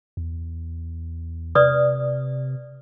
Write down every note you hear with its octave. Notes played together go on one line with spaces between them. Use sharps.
E2
C3 B4 D5 D#6